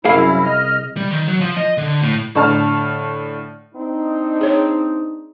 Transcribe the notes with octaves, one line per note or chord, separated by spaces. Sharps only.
C2 F#2 E4 G#4 F5
D#5 F6
G3
D#3
F#3
F3
D#5
D3
A2
A2 D3 D4 A5 F6
C4 D4 D#4
G#4 C#5